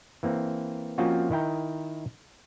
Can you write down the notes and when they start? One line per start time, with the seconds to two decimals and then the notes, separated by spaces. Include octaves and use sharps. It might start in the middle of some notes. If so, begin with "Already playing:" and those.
0.23 E3 A#3 C4
0.98 F3 A#3 C4 C#4 F4 F#4
1.31 D#3 E4 G5 A#5